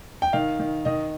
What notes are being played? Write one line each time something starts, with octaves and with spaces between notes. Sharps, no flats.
G5
D#3 F5
D#3
D#3 D#5